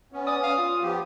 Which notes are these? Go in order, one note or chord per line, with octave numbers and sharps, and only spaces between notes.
B3 C#4
D5 D#6
F5
F4
F3 B3 G4